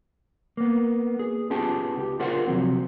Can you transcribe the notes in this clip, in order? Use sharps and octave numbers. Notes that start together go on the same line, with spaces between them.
A#3 B3
G#4
B3 C#4 F4 G4 G#4 A5
C#2 G4
F4 G#4 A#4 C5 F5 F#5
C3 F3 F#3 C4